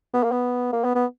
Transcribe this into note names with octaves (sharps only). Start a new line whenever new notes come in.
B3
A#3
B3
A#3
B3
B3